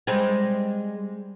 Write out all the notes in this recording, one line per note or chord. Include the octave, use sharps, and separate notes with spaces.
G3 G#3 C4